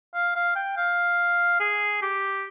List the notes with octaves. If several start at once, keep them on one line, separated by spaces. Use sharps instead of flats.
F5
F5
G5
F5
G#4
G4